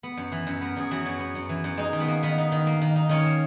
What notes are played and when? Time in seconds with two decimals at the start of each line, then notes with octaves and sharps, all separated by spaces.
0.03 B3
0.17 F#2
0.32 E3
0.47 F#2
0.61 B3 A#4
0.76 F#2 G#4
0.91 E3 F#3 F#4
1.06 F#2
1.20 B3
1.35 F#2
1.49 E3
1.64 F#2
1.77 G#3 D#4 G#4
1.93 D#3
2.00 B3 B4
2.08 A#3
2.23 D#3 B3 B4
2.38 D#4
2.52 D#3
2.67 A#3
2.81 D#3
2.96 D#4
3.09 D#3 C#4 C#5
3.26 A#3